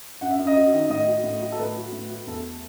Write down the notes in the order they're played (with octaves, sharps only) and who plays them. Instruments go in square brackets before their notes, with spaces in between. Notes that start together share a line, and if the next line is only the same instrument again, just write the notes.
[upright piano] F#2 F#5
E5
F#2
D#5
F#3
D#3
A2 D#5
F#3
A2
F#3
A4
A2 B4
F#3
A2
F#3
E2 A4